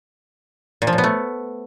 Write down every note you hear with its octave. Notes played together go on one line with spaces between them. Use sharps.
A#2
F3
A#2
B3
A3